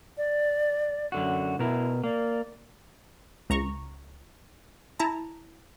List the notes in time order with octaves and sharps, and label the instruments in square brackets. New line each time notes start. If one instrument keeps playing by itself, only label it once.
[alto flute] D5
[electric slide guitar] F#2 D3 F#4
[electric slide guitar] B2 A#4 [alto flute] E4
[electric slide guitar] A#3 [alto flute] D5
[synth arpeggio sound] C#2 A#5 C#6
E4 A5 A#5